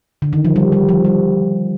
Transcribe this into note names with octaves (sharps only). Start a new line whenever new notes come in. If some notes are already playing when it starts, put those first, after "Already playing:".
D3
D#3
F3
G3
G3
F3
G3